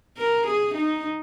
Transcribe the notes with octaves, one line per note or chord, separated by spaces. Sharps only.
A#4
G#4
D#4